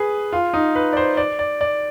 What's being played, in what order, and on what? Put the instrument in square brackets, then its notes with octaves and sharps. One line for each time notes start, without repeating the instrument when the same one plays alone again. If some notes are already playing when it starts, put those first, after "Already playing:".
Already playing: [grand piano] G#4 B4
F4
D#4
B4
D5
C5
D5
D5
D5